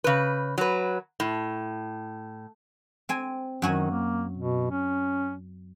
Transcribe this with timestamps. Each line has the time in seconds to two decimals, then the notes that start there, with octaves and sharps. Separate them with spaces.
0.04 C#3 B4
0.58 F#3 B4
1.20 A2
3.09 C4 G#5
3.62 F#2 D#3 F#4 G#5
3.90 A#3
4.37 B2
4.71 C#4